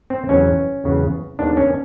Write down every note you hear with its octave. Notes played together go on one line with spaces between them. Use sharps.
C4
E2 C#3 F#3 B3 C#4
E2 C#3 F#3 B3
D#2 D#3 G#3 B3 D4
C#4